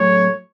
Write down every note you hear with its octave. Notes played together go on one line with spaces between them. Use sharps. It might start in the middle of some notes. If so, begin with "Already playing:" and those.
Already playing: A2 F#3 A3 C#5